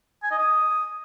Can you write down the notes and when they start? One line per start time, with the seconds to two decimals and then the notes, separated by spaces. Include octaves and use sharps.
0.23 G#5
0.31 D#5
0.39 D#6